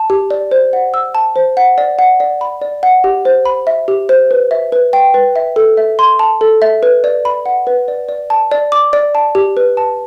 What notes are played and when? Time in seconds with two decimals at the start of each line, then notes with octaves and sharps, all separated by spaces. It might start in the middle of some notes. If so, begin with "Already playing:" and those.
Already playing: A5
0.10 G4
0.31 D5
0.51 C5
0.73 F#5
0.94 E6
1.15 A5
1.36 C5
1.57 F#5
1.78 D5
1.99 F#5
2.20 D5
2.41 B5
2.61 D5
2.83 F#5
3.04 G4
3.25 C5
3.46 B5
3.67 E5
3.88 G4
4.09 C5
4.31 B4
4.51 E5
4.72 B4
4.93 G5
5.14 B4
5.36 E5
5.56 A4
5.77 E5
5.99 C6
6.19 A5
6.41 A4
6.62 E5
6.83 B4
7.04 D5
7.25 B5
7.46 F#5
7.67 B4
7.88 D5
8.09 D5
8.30 A5
8.52 D5
8.72 D6
8.93 D5
9.15 A5
9.35 G4
9.57 B4
9.77 A5